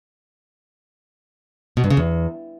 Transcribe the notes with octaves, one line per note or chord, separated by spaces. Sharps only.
B2
G2
C#3
E2